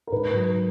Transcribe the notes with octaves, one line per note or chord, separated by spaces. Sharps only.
A#4
G#2 B4
F#3